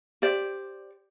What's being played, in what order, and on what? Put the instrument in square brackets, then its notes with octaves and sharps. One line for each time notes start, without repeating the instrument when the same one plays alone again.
[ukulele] G4 C5 D5